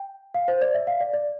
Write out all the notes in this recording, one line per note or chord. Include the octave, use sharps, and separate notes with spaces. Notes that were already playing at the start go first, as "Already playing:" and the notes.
Already playing: G5
F5
C5
D5
E5
F5
D5
D5